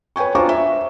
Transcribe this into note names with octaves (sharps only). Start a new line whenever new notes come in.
B4 C#5 G5 G#5 C#6
D4 F4 C5 A#5 C#6 D6
E5